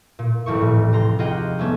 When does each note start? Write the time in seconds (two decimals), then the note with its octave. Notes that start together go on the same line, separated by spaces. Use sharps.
0.19 A#2
0.46 D#1 A1 F2 A2 C#6
0.61 A2
0.93 C3 A#5 C6
1.19 F4 G4 G#4 D#5 F#5 G5
1.58 G3 A3 B3 C#4 D4